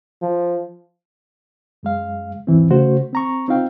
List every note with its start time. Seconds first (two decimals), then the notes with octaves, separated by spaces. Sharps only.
0.22 F3
1.83 F#2 G#3 F5
2.47 E2 G#2 E3 C4
2.70 C#3 A3 F#4 C5
3.13 C4 A#5 C#6
3.48 C4 D#4 F4 F5 G5